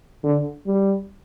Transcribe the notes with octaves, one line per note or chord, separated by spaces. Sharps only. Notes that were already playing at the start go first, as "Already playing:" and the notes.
D3
G3